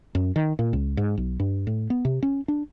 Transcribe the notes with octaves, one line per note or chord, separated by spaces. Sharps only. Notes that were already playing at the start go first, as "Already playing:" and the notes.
F#2
D#3
A#2
C#2
G#2
B1
G2
A2
B3
C3
C#4
D4